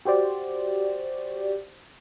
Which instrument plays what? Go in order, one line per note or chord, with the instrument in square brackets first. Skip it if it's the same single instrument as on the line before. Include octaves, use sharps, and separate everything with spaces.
[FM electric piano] F#4 G4 C5 D5